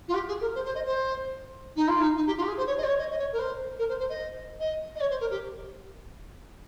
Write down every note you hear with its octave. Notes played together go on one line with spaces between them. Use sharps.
F4
G4
G#4
A#4
C5
C5
D#5
C5
D#4
F4
D#4
D#4
G4
F4
G4
G#4
C5
C#5
D#5
C5
C#5
D#5
D#5
C#5
A#4
C5
A#4
C5
C5
D#5
D#5
D#5
C#5
C5
A#4
G4